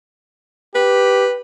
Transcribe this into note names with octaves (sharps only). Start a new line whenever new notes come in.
G4 B4